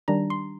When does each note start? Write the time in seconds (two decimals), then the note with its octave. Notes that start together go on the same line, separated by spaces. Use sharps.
0.08 D#3 G3 D4 A#5
0.30 C6